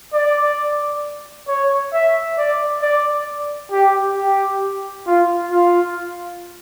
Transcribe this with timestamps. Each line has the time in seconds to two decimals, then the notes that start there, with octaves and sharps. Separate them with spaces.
0.13 D5
1.48 C#5
1.93 E5
2.38 D5
2.82 D5
3.72 G4
4.16 G4
5.07 F4
5.51 F4